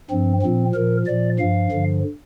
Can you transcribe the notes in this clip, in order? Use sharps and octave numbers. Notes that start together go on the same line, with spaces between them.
G2 F3 C4
A#2 F3 C4
A#2 F3 A#4
A#2 F3 D5
G2 F3 F5
G2 D3 F3